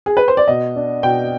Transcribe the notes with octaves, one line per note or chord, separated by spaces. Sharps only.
G#4
B4
C5
D5
B2 D#5
D4
B2 G5